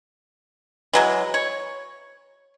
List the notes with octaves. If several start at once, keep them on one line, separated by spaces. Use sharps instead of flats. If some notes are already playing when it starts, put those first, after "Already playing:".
E3 F#3 G#3
C#5